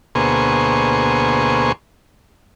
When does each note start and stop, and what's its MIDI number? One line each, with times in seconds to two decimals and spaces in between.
0.15 1.72 38
0.15 1.72 47
0.15 1.72 58
0.15 1.72 68
0.15 1.72 72
0.15 1.72 85